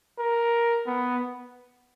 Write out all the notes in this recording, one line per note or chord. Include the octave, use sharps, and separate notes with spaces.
A#4
B3